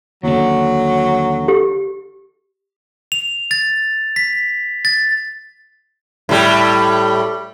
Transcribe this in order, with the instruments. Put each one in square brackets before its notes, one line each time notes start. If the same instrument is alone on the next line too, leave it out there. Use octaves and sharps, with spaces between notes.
[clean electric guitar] D#2 D3 [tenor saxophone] F#3
[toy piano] G4
[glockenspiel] F7
A6
B6
A6
[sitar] A2 G3